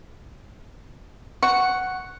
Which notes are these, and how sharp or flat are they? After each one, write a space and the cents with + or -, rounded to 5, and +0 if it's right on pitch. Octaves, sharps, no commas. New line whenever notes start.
F#5 +5 C#6 +0